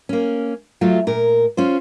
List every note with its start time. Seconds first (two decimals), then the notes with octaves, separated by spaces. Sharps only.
0.09 A#3 C#4
0.81 F#3 A3 F4
1.07 A#2 A#4
1.57 C#4 F4 C5